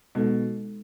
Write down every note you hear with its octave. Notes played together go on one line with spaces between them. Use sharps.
B2 G#3 D#4 A4